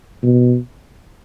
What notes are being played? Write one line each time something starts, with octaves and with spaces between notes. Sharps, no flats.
B2